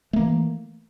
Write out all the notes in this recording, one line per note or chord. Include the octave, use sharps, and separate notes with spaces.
E3 A3 A#3